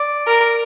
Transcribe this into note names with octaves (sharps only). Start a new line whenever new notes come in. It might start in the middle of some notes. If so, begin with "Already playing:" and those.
Already playing: D5
A#4